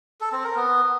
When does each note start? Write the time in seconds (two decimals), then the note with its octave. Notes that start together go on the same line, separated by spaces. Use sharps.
0.21 A4
0.32 C4
0.44 A#4
0.55 B3